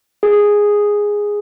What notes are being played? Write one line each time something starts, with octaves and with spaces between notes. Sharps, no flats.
G#4